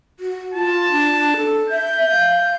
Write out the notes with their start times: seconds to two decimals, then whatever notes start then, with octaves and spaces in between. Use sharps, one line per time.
0.19 F#4
0.54 F4 A5
0.92 D4
1.37 A4
1.70 E5 G6
2.10 F5